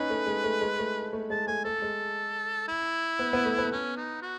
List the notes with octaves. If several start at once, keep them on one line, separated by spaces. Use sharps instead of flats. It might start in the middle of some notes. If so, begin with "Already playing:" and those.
Already playing: C#4 D#4 B4
A3
G#3
A3
G#3
A3
A3
G#3 A5
A3 G#5
A3 A4
G#3
E4
B3
B3
A3
B3
C#4
D#4
F#4